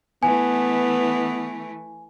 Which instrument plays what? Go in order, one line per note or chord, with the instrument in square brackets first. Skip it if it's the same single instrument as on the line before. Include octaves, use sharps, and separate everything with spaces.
[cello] E3 A3 [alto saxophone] B3 [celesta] G#5